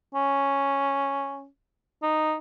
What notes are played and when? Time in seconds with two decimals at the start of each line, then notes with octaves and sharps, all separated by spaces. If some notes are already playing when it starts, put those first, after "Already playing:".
0.14 C#4
2.03 D#4